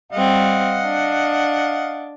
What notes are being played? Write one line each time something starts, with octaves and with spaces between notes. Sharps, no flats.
G3 C4 D#5 F5 F#5
D4